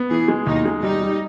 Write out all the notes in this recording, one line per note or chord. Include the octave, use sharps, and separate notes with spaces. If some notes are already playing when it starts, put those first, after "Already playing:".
Already playing: B3
E3 G#4
G#3
D#2 D#4
G#3
G3 D#4
G3